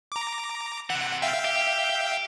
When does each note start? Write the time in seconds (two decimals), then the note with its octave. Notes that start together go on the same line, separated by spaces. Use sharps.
0.12 A#5 D6
0.90 C3 E3 F#5
1.22 E5 F5 G5
1.45 G4